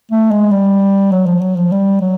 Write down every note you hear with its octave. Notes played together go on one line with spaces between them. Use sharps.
A3
G#3
G3
F#3
F3
F#3
F3
G3
F#3